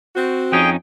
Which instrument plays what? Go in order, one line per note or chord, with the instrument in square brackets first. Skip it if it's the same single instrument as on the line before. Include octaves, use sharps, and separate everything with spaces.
[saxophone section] C4 F#4
[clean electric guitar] F2 C#4 D#4 [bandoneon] G#4 G5